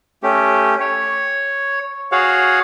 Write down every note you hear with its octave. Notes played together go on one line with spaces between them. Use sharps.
A3 C#4 G4
C#5
F#4 G#4 C#5 F5 F#5